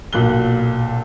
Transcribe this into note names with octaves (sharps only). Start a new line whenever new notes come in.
B1 A#2 F#6 G7